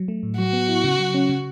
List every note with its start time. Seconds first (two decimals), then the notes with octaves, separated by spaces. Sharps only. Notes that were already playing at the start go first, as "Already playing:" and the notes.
Already playing: F#3
0.08 A3
0.23 A2
0.39 F#3 F#4
0.53 B3
0.69 E4
0.84 C#3
0.99 F#3
1.14 C#4
1.29 C#3